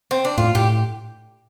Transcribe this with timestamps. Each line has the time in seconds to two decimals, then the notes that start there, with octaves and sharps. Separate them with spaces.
0.11 C4
0.25 D4
0.37 A2 F4
0.55 A2 G4